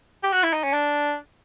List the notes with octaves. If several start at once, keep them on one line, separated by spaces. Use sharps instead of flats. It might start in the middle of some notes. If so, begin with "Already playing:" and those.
G4
F#4
E4
D#4
C#4
D4